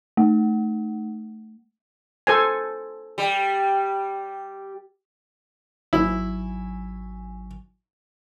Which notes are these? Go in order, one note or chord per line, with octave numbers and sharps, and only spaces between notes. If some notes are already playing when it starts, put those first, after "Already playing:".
A3
A4 C5 G#5
G3
G#1 F#3 E4 G#5